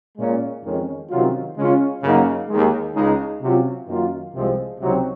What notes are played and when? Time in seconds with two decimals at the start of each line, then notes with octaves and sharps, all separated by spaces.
0.17 A#2 G#3 C#4 F4
0.63 F2 D#3 G#3 C#4
1.10 C3 D#3 F#3 C#4 F4
1.56 C#3 G#3 C#4 F4
2.02 F#2 C#3 F#3 A#3 D#4
2.48 D#2 D#3 G#3
2.94 C#2 C#3 G#3 D#4
3.41 C3 F#3 C#4 F4
3.87 F#2 D#3 A#3 F4
4.33 C2 C3 F3 G#3 C4
4.79 C#2 C3 F#3 C4 D#4